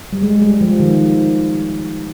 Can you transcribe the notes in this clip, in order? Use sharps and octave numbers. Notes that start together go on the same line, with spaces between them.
G3
G#3
G3
F3
D#3